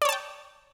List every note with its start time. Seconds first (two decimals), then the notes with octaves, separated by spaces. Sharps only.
0.02 D5
0.05 C#5
0.09 A5
0.12 G5